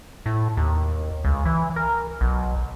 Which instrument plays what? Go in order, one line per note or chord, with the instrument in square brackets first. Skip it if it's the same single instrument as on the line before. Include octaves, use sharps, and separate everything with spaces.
[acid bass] A2
D#2
C#2
E3
A#4
B1